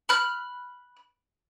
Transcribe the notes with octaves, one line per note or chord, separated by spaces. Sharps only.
B5 F6 F#6